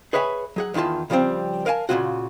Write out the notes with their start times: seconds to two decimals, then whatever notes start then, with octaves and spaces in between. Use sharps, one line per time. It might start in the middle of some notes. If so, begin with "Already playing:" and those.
0.13 G#4 B4 C#5 E5 G5 G#5
0.56 F#3 G#4 F#5
0.74 E2 D#3 E4 F4 A5
1.10 C#3 F3 G3 G#3 C4
1.66 A#4 F5 G#5 A5
1.89 A#2 C#3 E3 A3 F4 F#4